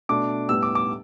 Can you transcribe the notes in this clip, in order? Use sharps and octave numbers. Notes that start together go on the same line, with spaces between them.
B2 A3 D4 D6
A2 G3 B3 E6
D6
D6